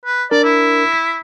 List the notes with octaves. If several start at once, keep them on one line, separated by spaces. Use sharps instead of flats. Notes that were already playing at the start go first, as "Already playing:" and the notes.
B4
D4 A#4 D5
E4
B6